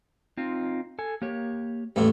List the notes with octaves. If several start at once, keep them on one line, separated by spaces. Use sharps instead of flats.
C4 D#4 F4
A4 G#5
A#3 G4 C#5
A1 E2 A2 A3 A#3 A4